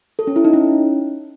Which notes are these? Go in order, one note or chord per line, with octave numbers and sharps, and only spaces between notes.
A4
C#4
E4
D#4
C#4